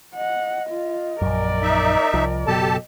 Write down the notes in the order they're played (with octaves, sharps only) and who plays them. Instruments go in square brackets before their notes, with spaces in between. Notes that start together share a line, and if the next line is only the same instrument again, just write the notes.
[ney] D#5 [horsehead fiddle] F#5
[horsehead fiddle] F4
[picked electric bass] A#1 F#2 [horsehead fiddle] A#4 D5
[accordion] D#4 E5
[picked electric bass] C2 F3
[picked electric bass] F#1 B2 F#3 [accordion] G4 A4 A5